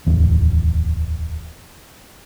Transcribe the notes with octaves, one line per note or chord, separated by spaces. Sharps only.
D1 E2